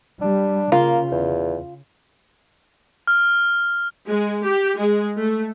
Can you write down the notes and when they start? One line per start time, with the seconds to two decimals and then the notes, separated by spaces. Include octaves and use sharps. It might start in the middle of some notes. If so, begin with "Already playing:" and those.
0.21 G3 D4
0.72 C#3 A#3 F4
1.12 E2
3.07 F6
4.07 G#3
4.46 G4
4.79 G#3
5.18 A3